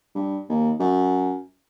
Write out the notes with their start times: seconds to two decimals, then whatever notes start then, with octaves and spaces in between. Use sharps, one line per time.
0.15 G2
0.49 D#2
0.80 F#2